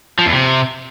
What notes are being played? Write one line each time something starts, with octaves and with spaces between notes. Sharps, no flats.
F3
E2
C3